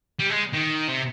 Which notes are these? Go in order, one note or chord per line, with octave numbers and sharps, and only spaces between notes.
G3
G#3
D#3
C3